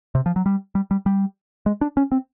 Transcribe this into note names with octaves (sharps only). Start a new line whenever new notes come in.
C3
F3
F#3
G3
G3
G3
G3
G#3
D4
C#4
C4